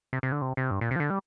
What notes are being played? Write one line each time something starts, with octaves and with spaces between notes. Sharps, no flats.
C3
C3
D3
C3
C3
G2
A#2
C3
F3
D3
G3